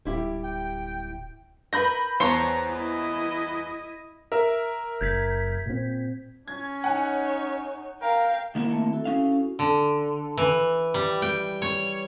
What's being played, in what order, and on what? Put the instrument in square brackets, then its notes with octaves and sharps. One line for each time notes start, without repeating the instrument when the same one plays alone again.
[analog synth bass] D1 [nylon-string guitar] G3 E4 G4
[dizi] G5
[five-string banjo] A#4 B4 [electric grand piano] B5 G6 A#6
[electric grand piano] E2 C7 C#7 [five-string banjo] C5 C#5 A5 [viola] A#5
[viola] E4 D#5
[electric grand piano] A#4 E5
[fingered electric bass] F#1 [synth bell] G6 G#6 B6
[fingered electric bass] A#2 C4
[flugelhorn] C#4 [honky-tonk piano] G#6
[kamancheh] D#4 C#5 [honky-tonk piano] F#5 G#5
[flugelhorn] A#4 [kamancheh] F5 G5
[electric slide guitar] D#3 A#3 E4
[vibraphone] A3 C4 E5
E4 F#4 A4
[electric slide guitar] C#4 F5
[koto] D3
E3
G3
G5
C#5